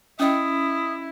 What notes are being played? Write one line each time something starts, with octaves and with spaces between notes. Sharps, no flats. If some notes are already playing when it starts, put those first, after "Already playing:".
C#4 E4 D#5 G5 D#6